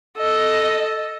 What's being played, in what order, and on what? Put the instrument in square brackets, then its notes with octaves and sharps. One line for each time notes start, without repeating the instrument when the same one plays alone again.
[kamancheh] A4 [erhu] D#5